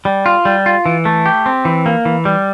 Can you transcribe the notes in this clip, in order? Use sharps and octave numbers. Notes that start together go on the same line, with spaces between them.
G3
F4
G3
F4
E3
A3
G4
C4
E3
A#3
E3
G3